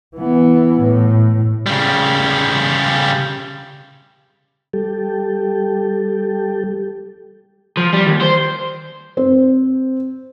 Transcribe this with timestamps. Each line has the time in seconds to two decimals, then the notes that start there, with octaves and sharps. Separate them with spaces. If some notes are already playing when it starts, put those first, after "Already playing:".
0.16 E3 B3
0.82 A2
1.67 C#3 G3
4.73 G3 G4 A4
7.77 F3
7.93 G3
8.07 D#2
8.21 C5
9.17 C4